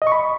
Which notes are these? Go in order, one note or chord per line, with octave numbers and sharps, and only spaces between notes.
D#5
C#6
B5